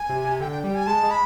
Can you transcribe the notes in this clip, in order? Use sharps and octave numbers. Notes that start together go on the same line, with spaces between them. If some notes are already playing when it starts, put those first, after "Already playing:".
Already playing: G#5
C3
C3
D3 G5
G5
G3 G5
G#5
G#3 A5
G#3
B5